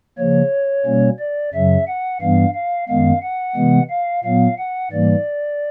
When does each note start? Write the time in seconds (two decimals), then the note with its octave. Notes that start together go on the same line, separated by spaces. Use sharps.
0.18 C#3 F3 A#3 C#5
0.86 B2 G3 A#3 C#4
1.19 D5
1.53 F#2 C#3 F#3 E5
1.87 F#5
2.21 G2 E3 G3 B3 F5
2.54 F5
2.88 F#2 D#3 G#3 B3 F5
3.22 F#5
3.56 C3 E3 G#3 B3
3.90 F5
4.24 A#2 F#3 B3 F5
4.58 F#5
4.92 G#2 E3 G3 A#3 D5